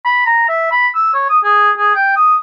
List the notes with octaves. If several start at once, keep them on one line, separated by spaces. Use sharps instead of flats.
B5
A#5
E5
B5
E6
C#5
D#6
G#4
G#4
G5
D#6